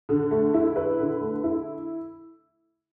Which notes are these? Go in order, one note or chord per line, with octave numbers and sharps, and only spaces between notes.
D3
A3
E4
B4
D3
A3
E4